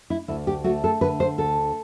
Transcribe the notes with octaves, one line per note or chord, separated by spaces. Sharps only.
E4
D2 E4
G4
A3 F#4
A4
D3 B4
C5
D2 A4